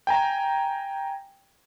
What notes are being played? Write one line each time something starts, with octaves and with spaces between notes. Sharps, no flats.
G5 G#5 A#5